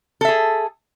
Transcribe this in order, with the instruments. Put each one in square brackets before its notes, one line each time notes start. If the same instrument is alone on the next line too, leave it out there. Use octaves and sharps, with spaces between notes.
[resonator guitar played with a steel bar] A4
E5
G#4